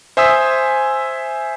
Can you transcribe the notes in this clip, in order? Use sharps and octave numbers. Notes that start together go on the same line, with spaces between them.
C5 E5 G#5 D#6 E6 B6